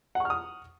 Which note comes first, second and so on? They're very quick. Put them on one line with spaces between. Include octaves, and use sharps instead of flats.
F#5 C#6 F6 D#6